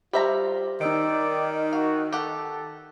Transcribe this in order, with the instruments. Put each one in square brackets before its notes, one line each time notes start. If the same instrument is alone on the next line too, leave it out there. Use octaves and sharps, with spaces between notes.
[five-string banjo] G3 E5 A#5 [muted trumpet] F4 [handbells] G4 C5
[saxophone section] D#3 [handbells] D#4 E6 D7 [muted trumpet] D5
[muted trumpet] F#4 [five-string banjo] F5
[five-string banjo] G4 F#5 [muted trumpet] A4